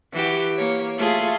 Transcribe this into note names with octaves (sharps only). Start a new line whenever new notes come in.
E3 F#4 G4
A#3 C#5
A3 F4 G#4